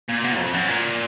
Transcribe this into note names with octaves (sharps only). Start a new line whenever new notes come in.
A#2
B2
F2
F#2
A#2